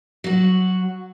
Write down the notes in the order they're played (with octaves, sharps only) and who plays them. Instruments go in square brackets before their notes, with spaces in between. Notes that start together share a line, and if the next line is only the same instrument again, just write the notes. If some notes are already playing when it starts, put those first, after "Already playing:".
[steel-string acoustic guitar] F#3 F#4